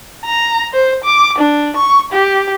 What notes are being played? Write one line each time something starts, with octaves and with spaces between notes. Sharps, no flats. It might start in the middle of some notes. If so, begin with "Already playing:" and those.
A#5
C5
D6
D4
C#6
G4